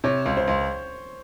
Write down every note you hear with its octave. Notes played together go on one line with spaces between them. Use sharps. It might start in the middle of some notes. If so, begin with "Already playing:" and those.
C3 C#5
C#2
C5
C#2